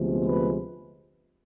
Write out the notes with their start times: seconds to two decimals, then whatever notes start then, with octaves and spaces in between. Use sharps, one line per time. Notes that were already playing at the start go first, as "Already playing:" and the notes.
Already playing: D2 C3 F3 G#3 B3
0.25 B4